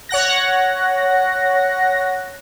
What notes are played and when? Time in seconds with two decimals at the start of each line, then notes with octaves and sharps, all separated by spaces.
0.09 C#5 F#5 F#6 A#6